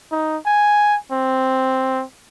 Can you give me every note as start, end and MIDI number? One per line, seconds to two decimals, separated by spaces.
0.12 0.37 63
0.46 0.97 80
1.12 2.04 60